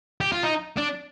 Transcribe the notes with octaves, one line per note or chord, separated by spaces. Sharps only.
G4
F4
D#4
D4